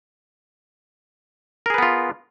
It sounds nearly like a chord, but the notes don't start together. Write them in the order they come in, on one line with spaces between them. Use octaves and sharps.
A#4 G#4 B4 B3 F4